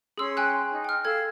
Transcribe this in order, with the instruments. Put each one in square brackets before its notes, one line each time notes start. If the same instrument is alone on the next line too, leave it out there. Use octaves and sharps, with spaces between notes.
[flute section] C#4 C6 [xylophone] G#4 E6
[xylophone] G5 G#5 F#6
[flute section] D#4
[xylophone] G5 F6
[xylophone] A4 G#6 [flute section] F5 E6